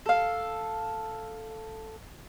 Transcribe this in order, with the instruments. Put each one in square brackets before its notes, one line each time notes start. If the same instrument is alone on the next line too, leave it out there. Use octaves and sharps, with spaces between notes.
[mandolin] A4 F5